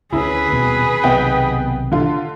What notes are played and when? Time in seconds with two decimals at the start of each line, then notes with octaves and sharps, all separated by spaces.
0.13 D2 C#4 E4 G#4 B4
0.52 D#1 B2 C4
1.04 B1 C3 D#3 B3 D#5 G5
1.92 D3 F4